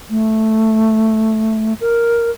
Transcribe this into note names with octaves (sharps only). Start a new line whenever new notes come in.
A3
A#4